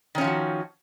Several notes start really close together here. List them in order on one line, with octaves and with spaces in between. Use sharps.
D#3 C#4 F3 F#3 F#4